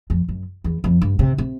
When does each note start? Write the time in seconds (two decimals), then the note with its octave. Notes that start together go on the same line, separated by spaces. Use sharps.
0.10 F2
0.29 F#2
0.64 E2
0.84 F2
1.02 G2
1.19 C3
1.38 C3